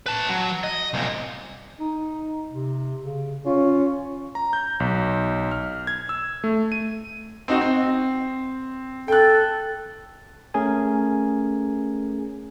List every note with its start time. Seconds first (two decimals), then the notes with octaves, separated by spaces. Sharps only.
0.06 B4 A5
0.29 F#3
0.63 D#5
0.94 C2 A#2
1.81 D#4
2.52 C3
3.04 C#3
3.46 C#4 F4
4.35 A#5
4.53 G6
4.80 B1
5.51 F6
5.87 G#6
6.09 E6
6.44 A3
6.72 D#7
7.48 C4 D#4 F#4
7.61 C4
9.08 A4 G5 F#6
10.54 A3 C#4 G#4 A#4 G#5